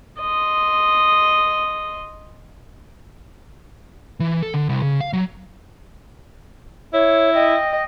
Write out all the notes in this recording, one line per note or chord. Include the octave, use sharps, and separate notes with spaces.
D#5 C6
E3
A4
D3
C2
C#3
F5
F#3
E4 C#5
D#5 G5